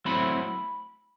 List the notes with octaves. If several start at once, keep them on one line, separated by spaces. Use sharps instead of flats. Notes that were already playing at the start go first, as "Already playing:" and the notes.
F#3 A3 C4 E4 B5